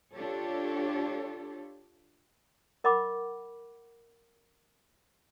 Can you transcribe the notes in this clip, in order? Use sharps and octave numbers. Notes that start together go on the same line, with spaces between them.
D4 F4 G4 A4 C#5
A#4 D#5 F#5 B5 D6